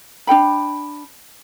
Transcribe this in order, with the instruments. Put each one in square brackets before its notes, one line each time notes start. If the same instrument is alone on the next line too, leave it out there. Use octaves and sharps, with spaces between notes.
[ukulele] D4 A4 G5 B5